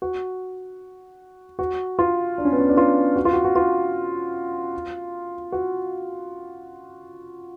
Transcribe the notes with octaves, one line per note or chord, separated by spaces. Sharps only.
F#4
F#4
F4
D4
C#4
B3
C#4
D4
F4
F#4
F4
F#4
F#4
F4
F#4